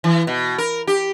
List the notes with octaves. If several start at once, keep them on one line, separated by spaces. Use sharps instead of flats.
E3
B2
A#4
G4